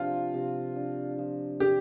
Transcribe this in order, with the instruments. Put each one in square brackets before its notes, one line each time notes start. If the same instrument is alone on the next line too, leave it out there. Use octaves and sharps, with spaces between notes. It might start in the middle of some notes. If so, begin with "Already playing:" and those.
Already playing: [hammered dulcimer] C3 F3 D4 [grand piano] F4
[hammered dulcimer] C3
D4
F3
[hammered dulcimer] C3 [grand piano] G4